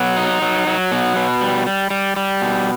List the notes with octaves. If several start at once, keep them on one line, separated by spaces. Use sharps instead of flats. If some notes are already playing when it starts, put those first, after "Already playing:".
Already playing: B2 F#3
D#4
F#3
F#3
B2
B2
G3
G3
G3
G3
B2